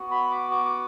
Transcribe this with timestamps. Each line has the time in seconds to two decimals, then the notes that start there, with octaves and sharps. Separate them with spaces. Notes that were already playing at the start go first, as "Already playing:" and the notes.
Already playing: B3 F#4
0.11 B5
0.31 D6
0.51 D6
0.66 D6